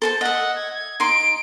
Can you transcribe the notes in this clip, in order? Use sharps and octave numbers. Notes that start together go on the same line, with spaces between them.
A4 C5 A5
D#5 E5 F#5
G#6
G#6
D#4 C6 D7